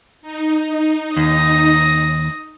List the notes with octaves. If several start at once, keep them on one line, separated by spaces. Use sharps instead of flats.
D#4
D#2 D#6 A#6